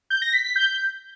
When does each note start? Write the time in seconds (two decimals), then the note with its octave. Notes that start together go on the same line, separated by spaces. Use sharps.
0.10 G6
0.22 A#6
0.33 B6
0.44 B6
0.56 G6